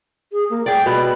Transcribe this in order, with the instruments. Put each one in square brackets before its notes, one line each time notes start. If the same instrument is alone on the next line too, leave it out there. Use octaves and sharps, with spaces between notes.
[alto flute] G#4
A#3
[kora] G#4 D5 [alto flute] G5
[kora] B2 [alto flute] B5